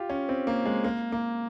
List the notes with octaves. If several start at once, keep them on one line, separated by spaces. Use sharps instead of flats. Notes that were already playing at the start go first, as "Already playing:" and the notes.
Already playing: F4 G4
C#4
C4
A#3
G#3
A#3
A#3